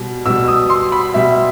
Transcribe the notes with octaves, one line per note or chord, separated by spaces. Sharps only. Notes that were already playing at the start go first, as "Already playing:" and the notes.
Already playing: B2 G3
B2 G3 E6
D#6
C6
B5
B2 G3 E5